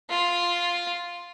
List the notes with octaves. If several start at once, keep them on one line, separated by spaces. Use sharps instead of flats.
F4